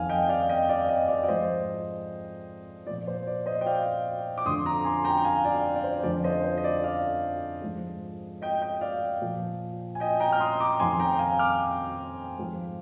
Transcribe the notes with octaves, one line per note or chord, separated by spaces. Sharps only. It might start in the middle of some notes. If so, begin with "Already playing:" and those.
Already playing: F2 D#3 F5 G#5
D#5 G5
D5 F5
F5
D#5 G5
D5 F5
D#5 G5
D5 F5
D5
G#2 F3 C5 D#5
A#2 F3 D5
C5
D5
C5 D#5
G5
D5 F5
D6
F2 D3 F3 C6 D#6
A#5 D6
G#5 C6
G5 A#5
F5 G#5
D5 F5
D5
C5
F2 D3 F3 D5
C5 D#5
C5
D#5
D5
D5 F5
G#2 F3
D#5 G5
D#5 G5
D5 F5
A#2 F3
G#5
D#5 G5
G5 A#5
F6
C6 D#6
A#5 D6
F2 D#3 G#5 C6
G5 A#5
F5 G#5
D6 F6
G#2 F3